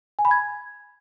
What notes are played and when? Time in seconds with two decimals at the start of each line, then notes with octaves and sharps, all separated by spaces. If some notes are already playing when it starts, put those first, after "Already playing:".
0.19 G#5
0.25 B5
0.31 G#6